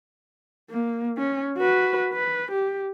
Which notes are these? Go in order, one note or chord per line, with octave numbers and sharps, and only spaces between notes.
A#3
C#4
F#4 B4
B4
G4